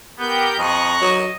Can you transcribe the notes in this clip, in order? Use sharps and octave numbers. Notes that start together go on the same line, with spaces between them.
B3 G4 A#4 G6
F2 D#5 A#5 C#6 F#6
F#3 D#5